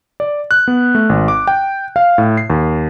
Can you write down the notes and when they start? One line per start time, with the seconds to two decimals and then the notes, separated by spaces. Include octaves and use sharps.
0.20 D5
0.51 F#6
0.68 B3
0.95 A3
1.09 G#1
1.28 D6
1.47 G5
1.96 F5
2.18 A2
2.37 C7
2.50 D#2